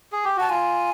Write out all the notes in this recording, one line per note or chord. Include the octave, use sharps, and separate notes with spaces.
G#4
G4
F#4 A5
F4 G#5